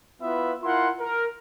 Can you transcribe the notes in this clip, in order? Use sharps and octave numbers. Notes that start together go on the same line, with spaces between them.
B3 E4 F4 B4 E5 B5
E4 F4 A#4 F#5 C6
A#4